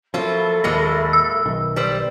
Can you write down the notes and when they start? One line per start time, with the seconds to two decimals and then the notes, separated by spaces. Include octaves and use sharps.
0.14 F3 F#3 A#3 F4 A4 E5 B5
0.64 D#2 A#2 F#3 G#3 A#3 A#6
1.13 E6
1.46 B1 D#3
1.76 G3 B4 C5